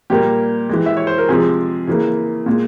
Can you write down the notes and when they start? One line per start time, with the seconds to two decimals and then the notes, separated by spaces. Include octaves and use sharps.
0.10 A#2 G3 A#3 G4
0.69 E3 G#3
0.86 E5
0.97 C#5
1.07 C5
1.18 A#4
1.28 C3 F3 G#3 G#4
1.87 C#3 E3 A#3
2.46 A#2 G#3